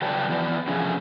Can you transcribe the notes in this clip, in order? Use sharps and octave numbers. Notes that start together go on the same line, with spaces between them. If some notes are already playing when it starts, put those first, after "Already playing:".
C#3 F#3 B4 D5 G5 A5
E3 B3 D5
C3 F3 A3 C#4 G#4 A4